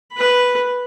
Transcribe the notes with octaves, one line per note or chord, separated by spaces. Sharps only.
B4 B5